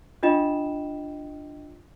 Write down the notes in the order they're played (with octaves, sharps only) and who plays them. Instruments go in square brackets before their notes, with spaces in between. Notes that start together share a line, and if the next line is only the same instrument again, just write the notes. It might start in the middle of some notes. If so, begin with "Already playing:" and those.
[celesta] D4 F4 D#5 G5 E7